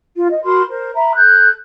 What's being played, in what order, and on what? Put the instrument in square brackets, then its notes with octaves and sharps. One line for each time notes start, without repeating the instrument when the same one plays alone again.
[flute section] F4
D#5
F#4 A#4 B5 C6
A#4 C5
E5 A#5 B5
A4 F#6 G6